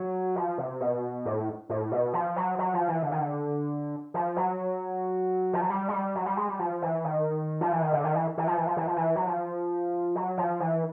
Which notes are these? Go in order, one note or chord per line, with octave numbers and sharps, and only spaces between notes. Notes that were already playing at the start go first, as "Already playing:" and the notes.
Already playing: F#3
F3
C3
B2
A2
A2
B2
F3
F#3
F#3
F3
E3
D3
D#3
D3
F3
F#3
F3
F#3
G3
G#3
G3
F#3
G3
G#3
G3
F3
E3
D#3
F3
E3
D#3
D3
D#3
E3
E3
F3
E3
F3
E3
F3
E3
F#3
F3
F#3
F3
E3